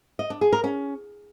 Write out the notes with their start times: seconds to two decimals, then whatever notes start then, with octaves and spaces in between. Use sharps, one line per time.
0.19 D#5
0.30 D4
0.41 G#4
0.52 A#4
0.64 C#4